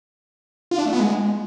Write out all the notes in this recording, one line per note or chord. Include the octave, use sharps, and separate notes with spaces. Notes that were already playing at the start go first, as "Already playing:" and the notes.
F4
D4
A3
B3
G#3